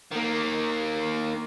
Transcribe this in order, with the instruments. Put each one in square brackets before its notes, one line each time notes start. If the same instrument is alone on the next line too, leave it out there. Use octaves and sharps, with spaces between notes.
[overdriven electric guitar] D#3 A#3